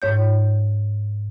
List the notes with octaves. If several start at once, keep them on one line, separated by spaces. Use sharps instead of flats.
G#2 C#5 G6